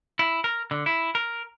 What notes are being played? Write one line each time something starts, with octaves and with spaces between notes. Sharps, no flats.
E4
A#4
D3
E4
A#4